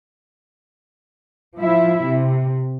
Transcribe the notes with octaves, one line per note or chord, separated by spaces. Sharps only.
F3 E4 E5
C3